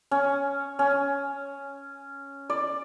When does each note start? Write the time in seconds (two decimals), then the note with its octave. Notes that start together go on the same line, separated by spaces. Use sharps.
0.11 C#4
0.79 C#4
2.50 D5